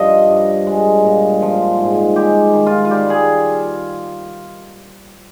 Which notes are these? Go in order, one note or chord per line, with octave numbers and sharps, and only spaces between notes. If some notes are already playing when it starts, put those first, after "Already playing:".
Already playing: G2 F3 D#5
G2
G#3
A#2
F3
G#2
G#3 G4
D#3
F4
F4
G3 G4
G#4